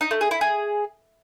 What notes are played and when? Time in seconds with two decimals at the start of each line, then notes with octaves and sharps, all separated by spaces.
0.01 D#4
0.11 A3
0.21 G#4
0.31 E4
0.41 G#4